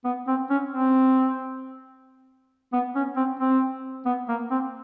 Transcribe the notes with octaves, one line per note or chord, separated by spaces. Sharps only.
B3
C4
C#4
C4
B3
C#4
C4
C4
B3
A#3
C4